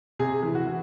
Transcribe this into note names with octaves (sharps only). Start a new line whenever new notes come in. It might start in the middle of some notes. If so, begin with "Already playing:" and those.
C3 G#4
E3
F#4
E3